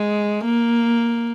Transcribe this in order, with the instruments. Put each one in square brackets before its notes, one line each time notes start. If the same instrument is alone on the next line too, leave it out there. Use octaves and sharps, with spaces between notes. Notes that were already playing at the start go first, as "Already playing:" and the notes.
Already playing: [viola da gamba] G#3
A#3